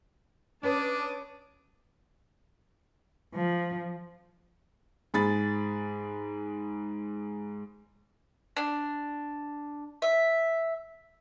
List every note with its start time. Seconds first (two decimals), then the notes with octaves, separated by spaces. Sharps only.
0.63 C#4 D4 B4 A5 D6 D#6
3.34 F3
5.14 G#2 G#4 B5 A6
8.57 D4
10.02 E5